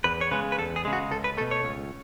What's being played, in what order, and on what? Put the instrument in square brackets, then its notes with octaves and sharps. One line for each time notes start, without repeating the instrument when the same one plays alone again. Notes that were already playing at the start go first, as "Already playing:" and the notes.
[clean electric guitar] E2 B4
C#5
C#3 G#3 B4
B4
E2 A4
G#4
C#3 G#3
F#4
C#2 A4
B4
A3 A4
B2
C#5
C#2